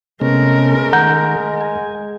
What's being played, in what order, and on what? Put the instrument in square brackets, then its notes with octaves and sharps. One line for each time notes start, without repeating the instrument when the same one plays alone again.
[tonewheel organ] C3 B3 C#4 [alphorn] G#3 [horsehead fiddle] A3 A#4
[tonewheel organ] D#3 [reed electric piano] F#5 A#5 G6
[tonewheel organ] G#5